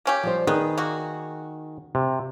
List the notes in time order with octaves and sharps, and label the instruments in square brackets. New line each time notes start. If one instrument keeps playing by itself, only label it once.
[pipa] A#3 C#4 G4
[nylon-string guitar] F3 G3 C5
[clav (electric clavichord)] D#3 [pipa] B3 [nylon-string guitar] G#4
[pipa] A#3 F#4
[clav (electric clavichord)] C3